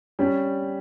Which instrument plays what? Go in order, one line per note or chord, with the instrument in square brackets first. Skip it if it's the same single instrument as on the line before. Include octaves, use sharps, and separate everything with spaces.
[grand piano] G3 [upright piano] C#4